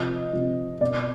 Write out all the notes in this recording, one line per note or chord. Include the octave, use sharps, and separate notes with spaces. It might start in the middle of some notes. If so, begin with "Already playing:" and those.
Already playing: C3 F3 D#5
C3 F3
B2 D5